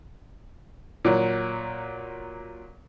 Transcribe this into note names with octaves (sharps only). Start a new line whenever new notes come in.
A#2 F#3